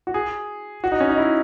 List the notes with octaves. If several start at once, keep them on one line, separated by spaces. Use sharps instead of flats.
F#4
G#4
F#4
D#4
C#4
D#4
E4